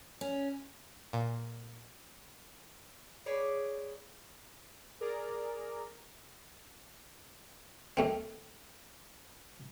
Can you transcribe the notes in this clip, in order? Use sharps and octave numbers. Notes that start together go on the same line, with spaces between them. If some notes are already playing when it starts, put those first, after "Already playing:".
C#4
A#2
G#4 B4 C#5 D5
G#4 A#4 D5 A#5
D#2 A3 C4